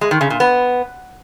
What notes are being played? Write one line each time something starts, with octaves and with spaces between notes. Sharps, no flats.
G#3
D#3
C#3
A#2
B3